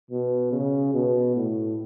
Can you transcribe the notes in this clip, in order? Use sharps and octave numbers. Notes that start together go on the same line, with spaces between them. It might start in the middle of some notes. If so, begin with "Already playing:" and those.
B2
C#3
B2
A2